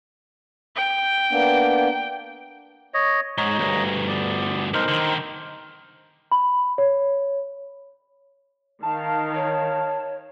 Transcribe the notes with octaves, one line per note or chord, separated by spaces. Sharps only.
G5
A#3 B3 D4
C#5 D#5
G#2 C#5 D#5 A#5
D2 G2
B3 D5
B1 D#4 A#4 C5
D3 D#3
B5
C#5
D#3 F5 A5
C#5